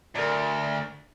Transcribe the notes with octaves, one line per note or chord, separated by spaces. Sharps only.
D2 A#4 D5